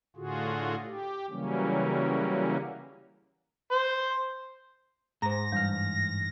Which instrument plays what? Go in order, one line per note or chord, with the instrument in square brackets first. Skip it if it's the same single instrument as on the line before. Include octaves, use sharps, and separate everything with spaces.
[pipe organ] A2 D3 F4 F#4 G#4
G4
C#3 E3 F#3 G3 A#3 C#4
[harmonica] C5
[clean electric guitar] G#2 [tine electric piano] G#4 [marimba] C5 A#5 [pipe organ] A#6
[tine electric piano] G2 E3 F6 [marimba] G3